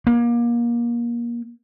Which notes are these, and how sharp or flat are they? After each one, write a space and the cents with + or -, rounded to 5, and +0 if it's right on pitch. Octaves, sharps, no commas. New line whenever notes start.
A#3 +25